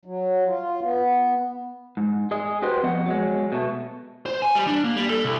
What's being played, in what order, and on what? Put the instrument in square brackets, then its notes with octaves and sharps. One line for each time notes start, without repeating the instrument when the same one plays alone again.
[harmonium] F#3
F4
B3
[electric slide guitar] G#2
G#4 D#5
F#4 G4 B4 C5
F2 B3 D#5 F#5
F#3 G#3
B2 A3
[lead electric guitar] C5
G#5
G3
D4
A#3
G3
A4
C2